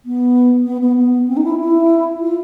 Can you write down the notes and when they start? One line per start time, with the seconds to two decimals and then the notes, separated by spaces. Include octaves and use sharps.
0.05 B3
0.66 B3
0.82 B3
0.97 B3
1.28 C4
1.37 D#4
1.45 E4
1.60 E4
2.21 F4